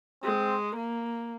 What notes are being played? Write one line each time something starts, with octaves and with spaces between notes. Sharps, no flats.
G#3 C4
A#3